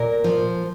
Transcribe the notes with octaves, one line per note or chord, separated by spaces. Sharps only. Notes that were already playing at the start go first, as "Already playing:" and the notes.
Already playing: A#2 A#4
F3